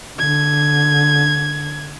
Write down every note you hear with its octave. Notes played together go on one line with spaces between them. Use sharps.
D3 G#6